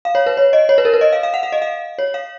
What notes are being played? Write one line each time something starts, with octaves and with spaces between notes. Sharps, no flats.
F5
C#5
B4
C#5
D#5
C#5
B4
A#4
B4
D#5
F5
F5
F#5
F5
D#5
F5
C#5
F5